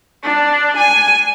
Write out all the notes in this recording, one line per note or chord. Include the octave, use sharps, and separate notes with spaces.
D4
G#5